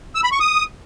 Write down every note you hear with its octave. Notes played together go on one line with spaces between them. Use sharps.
E6
B5
C#6
D#6